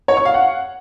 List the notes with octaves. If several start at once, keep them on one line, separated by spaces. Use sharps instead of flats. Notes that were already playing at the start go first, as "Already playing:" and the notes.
C#5
C#6
F5
F#5